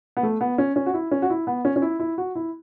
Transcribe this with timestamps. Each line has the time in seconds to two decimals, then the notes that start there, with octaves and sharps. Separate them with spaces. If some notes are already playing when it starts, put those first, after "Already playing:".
0.17 B3
0.23 A3
0.41 B3
0.58 C#4
0.76 C#4
0.86 F#4
0.94 E4
1.11 C#4
1.22 F#4
1.30 E4
1.47 B3
1.65 C#4
1.76 C#4
1.82 E4
2.00 E4
2.18 F#4
2.35 E4